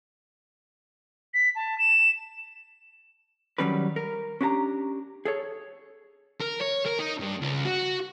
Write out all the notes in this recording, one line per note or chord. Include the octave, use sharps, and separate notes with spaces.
B6
A5
E7
D#3 F#3 G3 C#4 G4 B4
A#4
C#4 D4 E4 G4 A#5
G#4 A4 C#5
A#4
C#5
A#4
D#4
G2
C#2
F#4